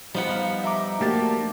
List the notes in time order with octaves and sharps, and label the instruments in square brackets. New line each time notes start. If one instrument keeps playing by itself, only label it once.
[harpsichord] F3 B3 [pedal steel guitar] G3 D#4 F#5
[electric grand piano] F5
E5 A#5 D6
[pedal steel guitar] A3 D4 F#4 [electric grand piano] A#3 G4 A6